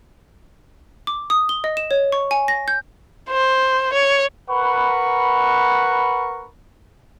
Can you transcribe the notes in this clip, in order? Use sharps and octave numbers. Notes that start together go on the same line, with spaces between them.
D6
D#6
G7
D#5
E7
C#5
C#6
G#5
A#6
G6
C5
C#5
A#4 B4 F#5 B5 C#6